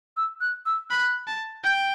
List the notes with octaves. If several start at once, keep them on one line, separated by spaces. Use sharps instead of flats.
E6
F#6
E6
B5 F#6
A5
G5 G6